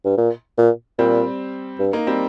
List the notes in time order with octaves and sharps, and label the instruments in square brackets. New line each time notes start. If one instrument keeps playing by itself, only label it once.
[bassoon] G2
A#2
A#2
[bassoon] A#2 [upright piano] G3 C4
[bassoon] G2
[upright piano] A#3 D#4
G3 C4